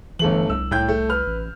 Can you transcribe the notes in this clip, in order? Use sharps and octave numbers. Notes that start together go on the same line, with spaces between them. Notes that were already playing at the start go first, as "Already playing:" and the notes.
G1 E3 A3 F#7
C2 E6
A2 G5 G6
A3
B4 F6
A1